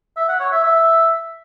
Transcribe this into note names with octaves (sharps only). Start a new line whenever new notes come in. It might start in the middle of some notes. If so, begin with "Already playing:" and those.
E5
F#5
C#5
E5
E5